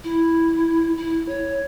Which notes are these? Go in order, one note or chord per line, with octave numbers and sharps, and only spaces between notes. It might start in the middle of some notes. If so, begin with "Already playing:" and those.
E4
E4
C#5